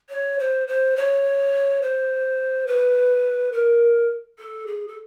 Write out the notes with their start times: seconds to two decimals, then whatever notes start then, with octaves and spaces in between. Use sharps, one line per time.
0.10 C#5
0.39 C5
0.68 C5
0.96 C#5
1.82 C5
2.67 B4
3.52 A#4
4.39 A4
4.67 G#4
4.88 A4